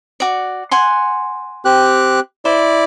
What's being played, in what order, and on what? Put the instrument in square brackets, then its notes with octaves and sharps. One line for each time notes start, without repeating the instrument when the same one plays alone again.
[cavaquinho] F#4 D5
F#5 G#5 C6
[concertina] C4 G4 F#6
[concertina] E4 D5 [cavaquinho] C5